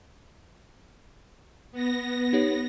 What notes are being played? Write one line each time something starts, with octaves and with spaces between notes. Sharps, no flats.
B3 A#6
D#4 G4 C#5